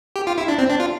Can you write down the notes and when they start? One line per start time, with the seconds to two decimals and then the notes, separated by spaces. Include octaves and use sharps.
0.16 G4
0.27 F4
0.38 E4
0.48 D4
0.59 C4
0.69 D4
0.80 F4